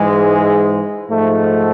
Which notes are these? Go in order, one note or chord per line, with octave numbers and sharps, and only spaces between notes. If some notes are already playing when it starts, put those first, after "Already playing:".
Already playing: G#2 E3 G#3
G#2 F3 A3